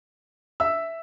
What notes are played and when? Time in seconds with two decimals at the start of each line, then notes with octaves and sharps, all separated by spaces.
0.60 E5 E6